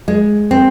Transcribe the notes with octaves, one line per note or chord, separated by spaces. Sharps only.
G#3
C4